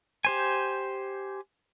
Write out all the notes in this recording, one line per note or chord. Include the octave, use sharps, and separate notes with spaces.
G4 C5 G#5